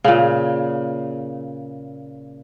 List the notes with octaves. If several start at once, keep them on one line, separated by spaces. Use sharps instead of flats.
A#2 C#3